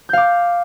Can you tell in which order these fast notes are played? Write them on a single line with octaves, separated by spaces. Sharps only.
G6 F5 D6